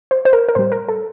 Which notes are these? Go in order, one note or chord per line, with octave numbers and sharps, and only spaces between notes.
C5
C5
A#4
A#4
A2 G3 C5
A#4
A4